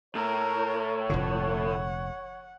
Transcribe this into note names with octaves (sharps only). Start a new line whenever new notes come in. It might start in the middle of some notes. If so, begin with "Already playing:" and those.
A2 A#4 C#5
F1 A#2 D3 F#5